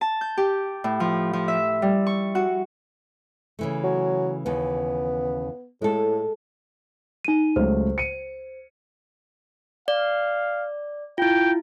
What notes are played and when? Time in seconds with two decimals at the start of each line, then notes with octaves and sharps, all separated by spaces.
0.01 A5
0.21 G6
0.37 G4
0.84 A2
1.00 F3
1.33 F3
1.48 E5
1.82 G3
2.07 C#6
2.35 F#4
3.59 C#3 E3 A3
3.84 F#3
4.46 D#2 C#3 E3 B3
5.82 A2 G#3 A4
7.25 D#4 D#7
7.56 C#2 F#3 A3 C5
7.98 C#7 D#7
9.88 D5 F5
11.18 E4 F4 G5